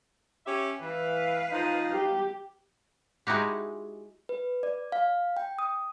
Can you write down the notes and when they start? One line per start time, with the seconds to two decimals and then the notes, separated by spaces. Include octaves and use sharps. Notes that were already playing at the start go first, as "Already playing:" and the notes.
0.47 C#4 G4 E5
0.81 E3 B4 F5
1.51 F3 D#4
1.92 G4
3.27 G#3 D#4 E4 F#4 G4
4.29 B4
4.63 D5
4.92 F5
5.37 G5
5.59 D#6